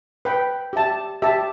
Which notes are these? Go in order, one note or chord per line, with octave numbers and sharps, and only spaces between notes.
B4 G5 B5
G4 E5 A5
G4 E5 A5